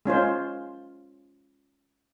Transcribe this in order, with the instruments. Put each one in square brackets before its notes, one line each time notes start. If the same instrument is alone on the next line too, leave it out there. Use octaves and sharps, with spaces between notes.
[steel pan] G#3 C#4 F4 C5